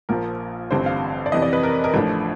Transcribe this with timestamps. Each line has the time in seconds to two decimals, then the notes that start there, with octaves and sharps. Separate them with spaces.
0.09 A#1 A#2 F3 A#4
0.71 A1 G2 D3 G3 C4 C5
0.86 F5
1.26 D5
1.32 F2 C3 E3 D#5
1.42 D5
1.53 B4
1.63 A#4
1.84 A#4
1.94 A1 A2 F3 A3 D4